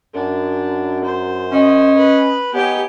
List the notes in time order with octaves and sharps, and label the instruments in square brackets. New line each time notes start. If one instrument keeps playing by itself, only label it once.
[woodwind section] F#2 [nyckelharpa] D4
[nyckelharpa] C5
[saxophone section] C#4 D#5
[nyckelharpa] B4
[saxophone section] B3 C#5 [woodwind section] D#4 G#5 [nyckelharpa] G4 G5